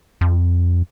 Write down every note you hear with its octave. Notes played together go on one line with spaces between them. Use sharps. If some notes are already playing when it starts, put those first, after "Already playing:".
F2